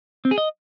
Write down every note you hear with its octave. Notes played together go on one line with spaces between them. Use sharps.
C4
G#4
D#5